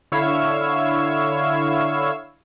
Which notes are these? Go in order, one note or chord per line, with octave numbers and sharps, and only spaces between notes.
D3 E4 C#5 F5 E6 G#6